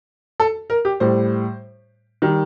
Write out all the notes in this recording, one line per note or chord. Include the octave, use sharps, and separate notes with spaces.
A4
A#4
G4
A2 G3 C5
D#3 G3